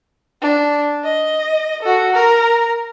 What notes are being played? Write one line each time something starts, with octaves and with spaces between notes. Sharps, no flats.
D4
D#5
F#4 A4
A#4